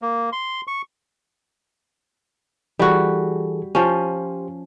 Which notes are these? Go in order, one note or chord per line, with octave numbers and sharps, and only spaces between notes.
A#3
C6
C#6
E3 G3 F#4 G#4 A4
F3 C#4 G4 C5